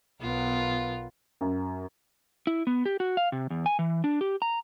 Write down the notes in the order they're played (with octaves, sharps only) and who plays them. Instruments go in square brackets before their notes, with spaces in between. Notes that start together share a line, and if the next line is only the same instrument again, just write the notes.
[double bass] B1 B3 [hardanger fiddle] F4 A#4
[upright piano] F#2
[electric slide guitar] E4
B3
G4
F#4
F5
C3
E2
G#5
E3
D4
G4
A#5